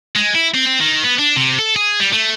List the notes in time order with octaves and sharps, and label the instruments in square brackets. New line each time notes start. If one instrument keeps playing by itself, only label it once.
[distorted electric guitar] G#3
E4
C4
C4
D#3
B3
D4
C3
A4
G#4
G3
A3